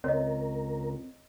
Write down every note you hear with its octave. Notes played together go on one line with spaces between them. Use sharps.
C#2 C4 A#4 C#5 D#5